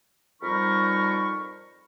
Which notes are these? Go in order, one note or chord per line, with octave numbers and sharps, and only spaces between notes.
F2 G3 D#4 A#4 B5 C#6